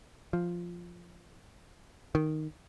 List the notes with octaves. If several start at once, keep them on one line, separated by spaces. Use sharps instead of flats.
F3
D#3